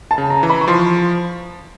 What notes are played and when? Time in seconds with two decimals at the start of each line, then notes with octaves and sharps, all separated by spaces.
0.11 A5
0.18 C#3
0.30 A#5
0.43 E3
0.50 B5
0.61 C#6
0.68 F3 C6